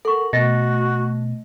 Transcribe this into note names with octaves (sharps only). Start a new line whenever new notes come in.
A4 A#4 F#5 C#6
B2 A3 F#4 D#5 A6 A#6